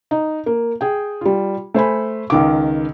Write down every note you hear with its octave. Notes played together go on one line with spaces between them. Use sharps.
D#4
A#3
G#4 G5
G3 F4
A3 C5 G#5 B5
C#2 D#3 D6